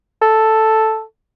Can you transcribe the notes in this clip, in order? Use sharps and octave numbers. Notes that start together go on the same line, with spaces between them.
A4